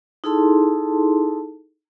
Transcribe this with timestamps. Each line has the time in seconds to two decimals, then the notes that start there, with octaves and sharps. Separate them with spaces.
0.24 D#4 E4 G#4 A4 A5 C6